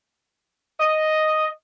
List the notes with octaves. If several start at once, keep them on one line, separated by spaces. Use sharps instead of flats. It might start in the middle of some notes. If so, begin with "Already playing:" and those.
D#5